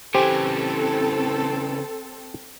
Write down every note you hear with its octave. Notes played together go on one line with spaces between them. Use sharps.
C#3 E3 C4 G4 A4 C5 G#5